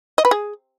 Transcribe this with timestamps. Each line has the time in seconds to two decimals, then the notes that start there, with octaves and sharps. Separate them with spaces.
0.18 D#5
0.25 B4
0.31 G#4